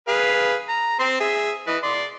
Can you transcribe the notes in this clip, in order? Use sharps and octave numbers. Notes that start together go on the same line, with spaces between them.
G#4 B4 F5
A#5
C4 C6
G#4 E5
E3 B4 D#5
D5 C6